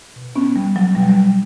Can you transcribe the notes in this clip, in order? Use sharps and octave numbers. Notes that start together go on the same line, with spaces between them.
B2
B3 C#4
G3
F#3
B2 G3
F#3
G3